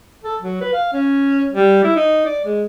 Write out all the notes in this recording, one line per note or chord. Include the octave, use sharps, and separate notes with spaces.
A4
F#3
B4
F5
C#4
G3
E4
D#4
D5
G#3